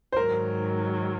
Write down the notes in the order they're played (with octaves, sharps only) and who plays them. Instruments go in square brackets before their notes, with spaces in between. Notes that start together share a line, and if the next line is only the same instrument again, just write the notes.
[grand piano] C5
[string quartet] G#2 D#3 F#3 [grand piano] A#4